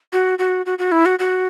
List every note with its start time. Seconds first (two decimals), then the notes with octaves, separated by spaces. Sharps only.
0.13 F#4
0.39 F#4
0.66 F#4
0.79 F#4
0.92 E4
1.06 F#4
1.19 F#4